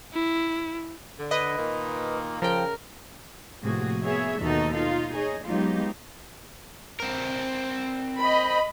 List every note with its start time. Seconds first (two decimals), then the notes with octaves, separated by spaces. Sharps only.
0.13 E4
1.19 D3
1.31 B4 D#5
1.57 A#2 D#3 A#3
2.42 C#3 F3 A#4 G5
3.63 A2 C3 F3 A#3 F#4 G#4
4.01 A#3 B3 G#4 C#5 E5
4.40 D#2 B2 D#4 F#4 A4
4.73 D#4 F4 F5
5.13 D#4 G#4 C#5 D#5
5.45 F#3 G#3 B3 D#4 F4 G4
7.00 C4 A#4
8.19 D#5 B5